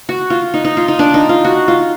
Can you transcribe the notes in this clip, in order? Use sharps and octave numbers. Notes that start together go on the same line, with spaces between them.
F#4
F4
D#4
D#4
F4
D#4
D4
D#4
F4
F#4
F4